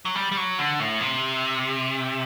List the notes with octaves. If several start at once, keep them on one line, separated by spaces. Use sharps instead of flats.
F#3
G3
G3
F#3
D3
A2
C3